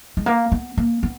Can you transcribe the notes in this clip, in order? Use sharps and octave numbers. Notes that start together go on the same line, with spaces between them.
G#3
A#3
B3
A#3
B3